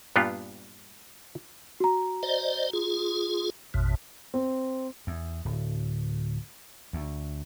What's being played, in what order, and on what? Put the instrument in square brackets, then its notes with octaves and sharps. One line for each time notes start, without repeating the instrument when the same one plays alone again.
[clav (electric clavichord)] G2 A#2 B3 D4 F4 G4
[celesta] F#4 A#5
[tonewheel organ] C5 D5 D#5
F4 G#4
A1 F2 B2
[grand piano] C4
[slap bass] E2
D1
D2